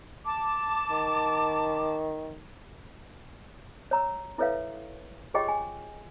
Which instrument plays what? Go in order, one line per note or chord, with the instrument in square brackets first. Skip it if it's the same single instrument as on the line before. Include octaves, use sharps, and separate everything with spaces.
[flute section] A5 D6
[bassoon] D#3
[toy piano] C#5 A#5 E6
E4 A4 B4 C#5 E5 F5
F4 G4 G#4 C#5 D#5 G5
G#5